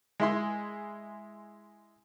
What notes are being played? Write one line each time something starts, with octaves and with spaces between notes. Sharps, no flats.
G#3 E4 C6